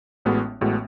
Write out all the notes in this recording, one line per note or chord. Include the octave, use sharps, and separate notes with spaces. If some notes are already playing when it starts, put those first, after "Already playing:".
A1 A2 G#3 B3 F#4
A1 A2 G#3 B3 F#4